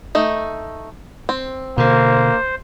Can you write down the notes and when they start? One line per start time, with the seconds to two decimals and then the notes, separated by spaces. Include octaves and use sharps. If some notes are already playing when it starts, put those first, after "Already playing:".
0.15 A3 D#4
1.29 C4
1.78 B2 D3 A#3 C5